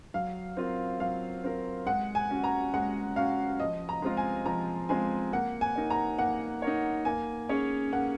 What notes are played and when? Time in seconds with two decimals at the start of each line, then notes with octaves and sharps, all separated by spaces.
0.14 F#3 F5
0.57 C4 F4 A#4
1.00 F#3 F5
1.44 C4 F4 A#4
1.86 G#3 F#5
2.15 G#5
2.30 C#4 F#4
2.44 A#5
2.74 G#3 F#5
3.16 C#4 F#4 F5
3.60 F3 D#5
3.89 A#5
4.02 G#3 C4 F4
4.17 G#5
4.46 F3 A#5
4.89 G#3 C4 F4 G#5
5.32 A#3 F#5
5.61 G#5
5.76 D#4 A#4 C#5
5.90 A#5
6.19 A#3 F#5
6.62 D#4 A#4 C#5
7.05 A#3 G#5
7.49 C#4 G#4 C#5
7.92 A#3 F#5